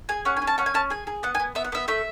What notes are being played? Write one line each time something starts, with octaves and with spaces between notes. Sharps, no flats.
G#4 G#5
C#4 F#5
G#5
C#4
A5
C#4 F#5
G#5
C#4 A5
G#4 G#5
G#4
B3 F#5
G#5
B3
B3 E5
F#5
B3 E5
A3 E5